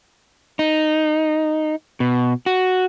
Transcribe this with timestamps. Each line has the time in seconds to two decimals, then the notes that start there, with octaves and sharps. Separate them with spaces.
0.59 D#4
2.00 B2
2.46 F#4